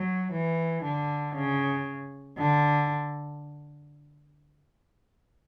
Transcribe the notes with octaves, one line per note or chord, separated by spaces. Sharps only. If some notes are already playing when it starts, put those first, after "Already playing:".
Already playing: F#3
E3
D3
C#3
D3